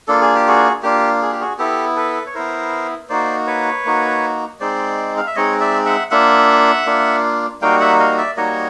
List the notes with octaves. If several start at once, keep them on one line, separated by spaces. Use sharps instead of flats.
A#3 D4 F4 A4
G#4
G4
F#4 G#4
A#3 D4 F4 G4
G#4
G4
F#4 G#4
B3 E4 G4 A4
A4 B4
C#5
B3 E4 A#4 C5
A#3 D#4 F#4 C5 D5
B4 C#5
A#3 D#4 F#4
G#3 C4 D#4 C5 D5
F5
E5
G#3 C4 D#4 C#5 D#5
D5 E5
E5 F#5
A#3 D4 F4 E5 F#5
A#3 D4 F4
G3 A#3 D#4 F#4 F5 G5
E5 F#5
D#5 F5
D5 E5
G3 A#3 D#4 F#4 C#5 D#5